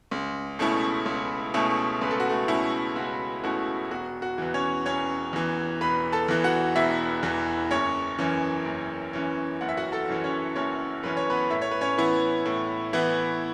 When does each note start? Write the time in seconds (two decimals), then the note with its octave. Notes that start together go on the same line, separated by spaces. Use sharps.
0.11 C#2
0.59 B2 A3 C#4 E4
1.06 C#2
1.54 B2 A3 C#4 E4
2.01 C#2 B4
2.11 A4
2.20 F#4
2.30 A3 A4
2.48 B2 A3 C#4 E4
2.96 C#2 F#4
3.44 B2 A3 C#4 E4 F#4
3.91 E1 F#4
4.22 F#4
4.38 E2 E3
4.54 C#4 C#5
4.86 E1 C#4 C#5
5.33 E2 E3
5.81 E1 B4 B5
6.12 A4 A5
6.28 E2 E3
6.44 F#4 F#5
6.76 E1 E4 E5
7.23 E2 E3
7.71 F#1 C#4 C#5
8.18 F#2 E3 C#4
8.66 F#1
9.13 F#2 E3 C#4
9.61 F#1 F#5
9.69 E5
9.77 F#4 F#5
9.92 A4 A5
10.08 F#2 E3 C#4
10.24 C#4 C#5
10.56 F#1 C#4 C#5
11.03 F#2 E3 C#4 B4
11.17 C#5
11.30 B3 B4
11.50 A2 E5
11.62 C#5
11.71 B4
11.81 C#4 C#5
11.98 E3 B3 E4
12.45 A2
12.93 E3 B3 E4